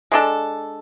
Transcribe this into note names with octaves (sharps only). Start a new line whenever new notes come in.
G#3 D4 A4